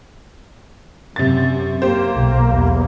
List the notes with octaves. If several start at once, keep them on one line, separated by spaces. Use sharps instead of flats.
F#2 C3 A6
A#3 G4 C5
B1
E2